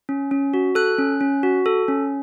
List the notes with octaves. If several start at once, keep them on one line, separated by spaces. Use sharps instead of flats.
C#4
C#4
F#4
A4 F#6
C#4
C#4
F#4
A4
C#4